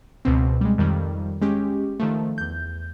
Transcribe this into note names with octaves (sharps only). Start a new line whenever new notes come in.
C#2 B2 C4
G3 G#3
F2 D#3 G3
G#3 C#4 G4
D#3 F3 A3
E2 G6